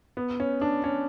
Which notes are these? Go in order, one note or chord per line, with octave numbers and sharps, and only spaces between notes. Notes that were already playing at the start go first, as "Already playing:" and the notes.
B3
C#4
D4
C#4